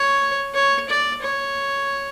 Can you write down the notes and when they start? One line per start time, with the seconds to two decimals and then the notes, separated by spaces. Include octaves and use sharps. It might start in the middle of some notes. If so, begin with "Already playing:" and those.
Already playing: C#5
0.54 C#5
0.88 D5
1.22 C#5